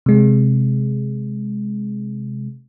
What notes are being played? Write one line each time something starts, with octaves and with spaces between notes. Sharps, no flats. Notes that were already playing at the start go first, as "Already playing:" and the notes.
C3 G#3